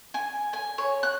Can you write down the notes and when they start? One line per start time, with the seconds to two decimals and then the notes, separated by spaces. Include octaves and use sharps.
0.14 G#5
0.53 G#5
0.78 C#5
1.03 F#6